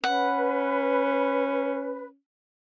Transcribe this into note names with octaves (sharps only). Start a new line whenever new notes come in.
C#4 B4 F#5